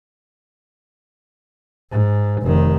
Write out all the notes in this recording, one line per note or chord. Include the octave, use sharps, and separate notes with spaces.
G#2
F1 D#3